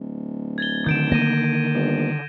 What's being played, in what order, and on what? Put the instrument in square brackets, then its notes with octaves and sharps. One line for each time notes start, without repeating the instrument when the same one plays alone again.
[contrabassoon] D1
[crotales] G#6 A6 G7
[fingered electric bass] D3 D#3 [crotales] G6 D7 E7
[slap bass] A#3 [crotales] A#6 D#7
[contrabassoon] G1